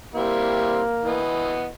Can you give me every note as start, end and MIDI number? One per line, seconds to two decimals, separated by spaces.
0.15 0.83 55
0.15 1.20 58
0.15 0.83 60
0.15 0.83 64
1.05 1.69 52
1.05 1.69 59
1.05 1.69 75